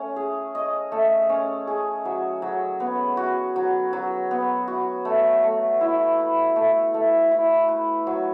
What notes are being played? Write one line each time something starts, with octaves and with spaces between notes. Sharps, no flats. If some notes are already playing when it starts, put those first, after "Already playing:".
Already playing: A3 C#4
G#4
D#5
A3
C#4
G#4
F#3
F#3
B3
F#4
F#3
F#3
B3
F#4
A3
A3
E4
B4
A3
A3
E4
B4
F#3